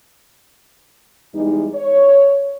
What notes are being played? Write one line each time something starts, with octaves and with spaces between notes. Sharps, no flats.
E2 G3 G#3 D#4
C#5